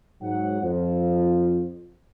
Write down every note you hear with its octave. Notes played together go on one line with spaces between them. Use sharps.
G#2 F#3 F#5
F2 F3